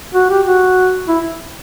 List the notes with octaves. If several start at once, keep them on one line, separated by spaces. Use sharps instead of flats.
F#4
G4
F#4
E4